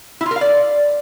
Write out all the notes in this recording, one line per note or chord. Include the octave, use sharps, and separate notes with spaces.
E4
F4
A#4
F5
D5